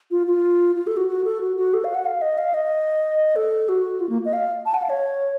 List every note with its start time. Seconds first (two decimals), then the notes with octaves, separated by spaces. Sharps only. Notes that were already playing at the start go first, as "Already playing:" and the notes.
0.11 F4
0.27 F4
0.76 F4
0.87 A4
0.97 F#4
1.09 F#4
1.24 A4
1.41 F#4
1.57 F#4
1.74 A4
1.84 F5
1.95 F#5
2.06 F5
2.22 D#5
2.38 F5
2.54 D#5
3.36 A4
3.69 F#4
4.00 F4
4.09 A#3
4.25 D#5
4.33 F5
4.66 A5
4.74 F#5
4.82 F5
4.90 C#5